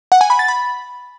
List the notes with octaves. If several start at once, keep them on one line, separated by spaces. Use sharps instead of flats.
F#5
G#5
B5
A6
B5